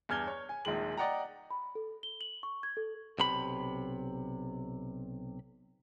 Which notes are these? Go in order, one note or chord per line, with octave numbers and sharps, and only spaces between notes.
E2 G2 F6 G#6 G7
C#5
G#5
D#1 A#1 D#3 G#3 F#7
D5 D#5 F#5 G5 A#5
B5
A4
G7
F#7
C#6
G#6
A4
B1 C3 B5